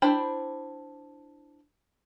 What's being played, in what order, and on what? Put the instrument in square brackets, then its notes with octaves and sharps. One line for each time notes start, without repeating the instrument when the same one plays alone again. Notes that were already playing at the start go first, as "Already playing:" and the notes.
[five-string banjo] D4 E4 C5 G5 B5